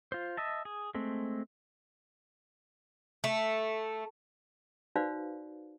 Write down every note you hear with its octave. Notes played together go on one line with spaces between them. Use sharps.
F4 C5
D#5 E5 A5
G#4
G#3 A3 C4
A3
D#4 F#4 B4 C5 D5 F5